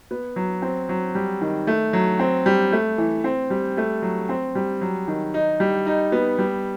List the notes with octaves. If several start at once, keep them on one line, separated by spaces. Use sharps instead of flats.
B3
F#3
C4
F#3
G3
D#3
A3
F#3
C4
G3
A3
E3
C4
G3
A3
F#3
C4
G3
F#3
D#3
D#4
G3
D#4
B3
G3